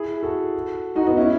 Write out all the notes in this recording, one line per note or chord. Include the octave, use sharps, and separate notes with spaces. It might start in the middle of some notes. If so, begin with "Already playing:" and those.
Already playing: E4 G#4
F#4 A4
D#4 F#4
B3 D#4
C#4 E4